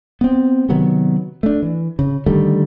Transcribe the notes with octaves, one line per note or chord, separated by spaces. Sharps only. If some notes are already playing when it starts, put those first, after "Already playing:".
B3 C4
C3 D#3 F#3 B3
A3 D4
E3
C#3
D3 D#3 G3 A3